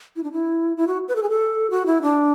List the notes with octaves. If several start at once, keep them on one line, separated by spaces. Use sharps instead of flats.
E4
D4
E4
E4
F#4
B4
A4
G#4
A4
F#4
E4
D4